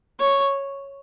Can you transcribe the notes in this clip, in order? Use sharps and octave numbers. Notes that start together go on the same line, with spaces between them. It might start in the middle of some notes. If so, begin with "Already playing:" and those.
C#5